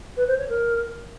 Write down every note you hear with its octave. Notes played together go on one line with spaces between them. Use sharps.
B4
C5
C#5
A#4